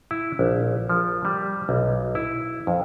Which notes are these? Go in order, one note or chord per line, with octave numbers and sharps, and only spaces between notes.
E4
A#1
F3
G3
B1
E4
F2